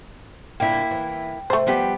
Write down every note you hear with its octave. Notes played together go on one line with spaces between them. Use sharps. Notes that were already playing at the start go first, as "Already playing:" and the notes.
A#2 D3 A#3 E4 G5
E3
C3 A3 C5
F3 G3 B3 G4